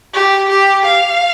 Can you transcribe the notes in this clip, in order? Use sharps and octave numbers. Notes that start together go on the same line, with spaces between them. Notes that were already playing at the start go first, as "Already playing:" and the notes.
G4
G4
F5